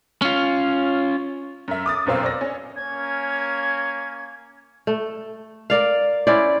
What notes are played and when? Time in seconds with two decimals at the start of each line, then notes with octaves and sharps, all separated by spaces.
0.22 C#4 F4
1.68 F#2 E5
1.86 D6 D#6 A6
2.06 F1 F#2 B2 C4 F5 E6
2.23 D5 A#6
2.41 C#4
2.76 A#3 C#4 G#6
4.87 A3
5.70 A#4 D5 F5
6.27 C#4 E4 C5 D5